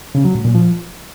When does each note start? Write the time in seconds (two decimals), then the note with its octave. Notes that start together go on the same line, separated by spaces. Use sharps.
0.15 C#3
0.25 F#3
0.35 A2
0.45 A#2
0.55 F3